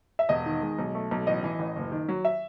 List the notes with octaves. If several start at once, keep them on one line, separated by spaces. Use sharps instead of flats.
E5
E1 D#5
D#3
G#3
B1
A3
B1
A1 D#5
E3
A1
F#1
D#3
F#3
E5